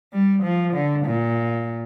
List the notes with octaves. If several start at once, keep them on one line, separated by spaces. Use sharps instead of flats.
G3
F3
D3
A#2